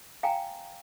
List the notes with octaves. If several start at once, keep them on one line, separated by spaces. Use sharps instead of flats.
F5 G5 G#5 A#5